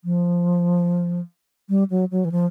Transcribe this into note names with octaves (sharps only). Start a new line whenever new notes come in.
F3
G3
F#3
F#3
E3
F3